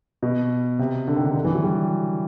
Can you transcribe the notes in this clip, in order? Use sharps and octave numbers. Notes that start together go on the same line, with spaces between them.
B2
C3
D3
D#3
D3
D3
E3
F#3
G3